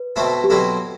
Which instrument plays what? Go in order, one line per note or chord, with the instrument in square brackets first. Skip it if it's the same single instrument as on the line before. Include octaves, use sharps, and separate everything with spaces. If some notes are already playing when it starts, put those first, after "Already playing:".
Already playing: [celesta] B4
[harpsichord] B2 A3 C4 E4
[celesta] G4
[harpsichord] B2 F#3 C4 E4 [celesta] A4